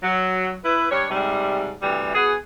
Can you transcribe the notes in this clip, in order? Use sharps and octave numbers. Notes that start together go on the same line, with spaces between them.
F#3
E4 B4
G3 D4 C#5
G#2 C3 G3
D2 C3 E3 G3
B3 F#4 G#4